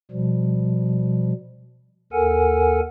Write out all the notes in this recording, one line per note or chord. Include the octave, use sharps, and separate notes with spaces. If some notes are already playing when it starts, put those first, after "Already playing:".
B2 F3 G3
D#2 A4 A#4 F#5 G#5